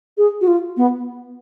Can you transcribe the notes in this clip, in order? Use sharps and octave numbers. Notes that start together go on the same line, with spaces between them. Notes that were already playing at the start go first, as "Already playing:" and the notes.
G#4
F#4
F4
B3